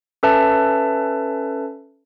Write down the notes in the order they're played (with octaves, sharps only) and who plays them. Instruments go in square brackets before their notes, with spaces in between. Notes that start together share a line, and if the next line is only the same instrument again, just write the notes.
[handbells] C#4 A4 B4 E5 A5